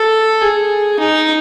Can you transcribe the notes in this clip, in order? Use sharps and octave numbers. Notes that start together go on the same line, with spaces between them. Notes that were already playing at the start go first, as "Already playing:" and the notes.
Already playing: A4
G#4
D#4